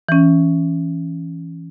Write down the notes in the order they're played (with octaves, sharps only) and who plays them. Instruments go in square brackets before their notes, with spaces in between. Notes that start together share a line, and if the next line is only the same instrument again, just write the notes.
[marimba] E3 C#4